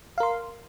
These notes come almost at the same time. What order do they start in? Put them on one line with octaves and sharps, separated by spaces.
F5 A#4 C6